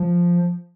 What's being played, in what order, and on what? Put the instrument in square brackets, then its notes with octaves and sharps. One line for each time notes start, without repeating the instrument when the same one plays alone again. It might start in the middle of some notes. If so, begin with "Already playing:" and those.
Already playing: [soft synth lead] F3